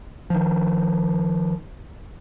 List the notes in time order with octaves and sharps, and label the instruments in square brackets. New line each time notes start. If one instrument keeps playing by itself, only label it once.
[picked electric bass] D#3 F3